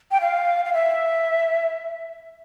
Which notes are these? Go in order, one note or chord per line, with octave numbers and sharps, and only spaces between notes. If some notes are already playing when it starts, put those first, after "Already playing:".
G5
F5
F5
E5